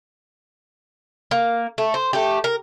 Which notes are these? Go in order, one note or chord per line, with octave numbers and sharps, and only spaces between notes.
A#3
A3
C5
A3 G4
A#4